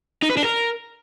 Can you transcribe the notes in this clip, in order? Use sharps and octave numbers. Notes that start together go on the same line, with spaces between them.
D#4
B4
D4
A#4